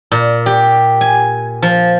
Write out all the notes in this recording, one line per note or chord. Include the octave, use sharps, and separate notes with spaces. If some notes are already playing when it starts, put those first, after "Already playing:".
A#2
G4
G#5
F3